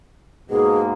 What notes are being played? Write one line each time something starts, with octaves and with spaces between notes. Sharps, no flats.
G#2 B2 A#3 G#4